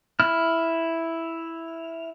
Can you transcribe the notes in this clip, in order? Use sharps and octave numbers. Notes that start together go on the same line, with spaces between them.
E4 F6